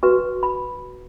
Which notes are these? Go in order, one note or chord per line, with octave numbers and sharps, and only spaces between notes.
F#4 B4 C#6
B5